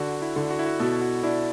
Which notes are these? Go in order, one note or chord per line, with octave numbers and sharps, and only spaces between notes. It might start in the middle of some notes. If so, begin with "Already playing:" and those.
Already playing: D3 F#4
E4
D3
F#4
E4
F#4
B2 A4
F#4
D4 E4